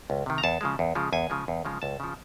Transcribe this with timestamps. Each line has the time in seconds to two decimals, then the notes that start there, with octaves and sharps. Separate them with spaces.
0.10 C#2
0.26 C3 D#3
0.38 A#5
0.44 E2 A5
0.61 C#3 F3 G#3
0.79 E2
0.95 C#3 F3 G#3
1.13 E2 G#5
1.30 C#3 F3 G#3
1.48 E2
1.65 C#3 F3 G#3
1.82 C#2 A5
2.00 C#3 F3